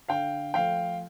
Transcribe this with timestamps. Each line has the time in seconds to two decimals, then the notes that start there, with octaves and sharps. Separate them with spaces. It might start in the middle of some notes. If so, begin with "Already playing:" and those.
0.08 D3 F5 G5
0.54 F3 A3 F5 G5